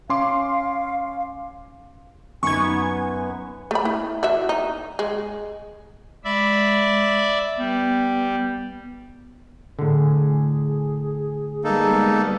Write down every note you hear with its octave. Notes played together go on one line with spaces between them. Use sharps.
C#4 F5 C6 D6
F#2 B3 D#4 G#5 C#6 G#6
A3 B5
E4
E3 F#4 E5
D#4
G#3
G#3 D5 E5 B5
G3 B3
A2 D3 G#4
G3 G#3 A#3 B3 D#4 A4